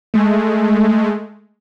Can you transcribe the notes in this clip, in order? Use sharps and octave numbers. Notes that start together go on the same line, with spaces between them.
G#3 A3